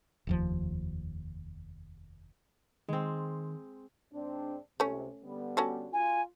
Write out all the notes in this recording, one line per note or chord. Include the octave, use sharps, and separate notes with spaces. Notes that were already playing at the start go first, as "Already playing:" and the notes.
F1 D#2 F3
D#3 G#3 C4
G#2 C4 D4
C#2 C3 A3 C#4
D3 G3 B3
C#4 F#4 A4
F4 G#5